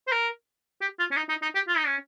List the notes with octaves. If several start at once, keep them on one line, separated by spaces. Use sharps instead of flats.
C5
A#4
G4
F4
C#4
D#4
D#4
D#4
G4
F4
D#4
C#4